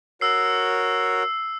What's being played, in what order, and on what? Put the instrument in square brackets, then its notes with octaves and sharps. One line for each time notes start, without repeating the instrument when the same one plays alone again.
[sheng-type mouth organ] F#4 A#4 C#5 [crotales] E6 C7